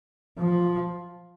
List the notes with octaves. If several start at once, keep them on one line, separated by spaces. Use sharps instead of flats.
F3